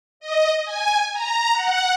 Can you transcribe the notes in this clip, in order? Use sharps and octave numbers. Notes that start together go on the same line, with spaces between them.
D#5
G#5
A#5
F#5